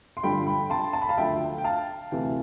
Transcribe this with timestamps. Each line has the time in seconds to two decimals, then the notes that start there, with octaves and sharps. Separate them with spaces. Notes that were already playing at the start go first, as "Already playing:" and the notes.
0.17 C6
0.23 G2 D3 F3 G5 B5
0.47 G5 B5
0.70 A5 C6
0.93 A5
1.02 B5
1.09 F5 A5
1.17 D2 D3 F3 E5 G5
1.58 G5
1.64 F5 A5
2.12 D2 C3 E3